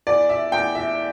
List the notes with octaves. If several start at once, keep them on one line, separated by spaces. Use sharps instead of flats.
E2 D5
E5
E2 G5
E5